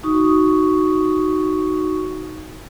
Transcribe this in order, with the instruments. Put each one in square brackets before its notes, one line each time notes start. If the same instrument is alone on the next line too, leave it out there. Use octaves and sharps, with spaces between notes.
[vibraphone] D#4 F#4 C#6 D#6